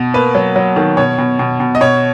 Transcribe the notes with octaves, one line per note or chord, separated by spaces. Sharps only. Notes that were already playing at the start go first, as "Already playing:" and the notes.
Already playing: B2
A#3 B4
F#3
F#3
D#3
B2 C#5
B2
B2
B2
D#5
B2 C#5